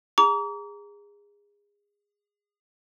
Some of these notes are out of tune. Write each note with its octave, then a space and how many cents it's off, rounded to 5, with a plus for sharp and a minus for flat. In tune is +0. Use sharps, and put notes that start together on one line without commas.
G#4 -20 A#5 +0 D6 -40